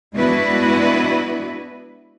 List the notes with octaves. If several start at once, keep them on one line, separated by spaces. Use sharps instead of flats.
G#3 B3 D4 E4 F#4 B4